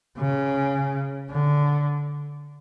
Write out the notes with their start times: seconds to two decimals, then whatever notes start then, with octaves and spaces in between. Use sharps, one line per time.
0.18 C#3
1.31 D3